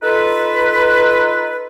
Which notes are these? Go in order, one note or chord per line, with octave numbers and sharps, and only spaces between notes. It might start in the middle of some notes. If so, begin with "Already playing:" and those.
D#4 F4 A4 B4